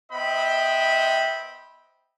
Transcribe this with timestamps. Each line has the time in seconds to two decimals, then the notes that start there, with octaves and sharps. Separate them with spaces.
0.12 B3 C5 D#5 E5 G5 B5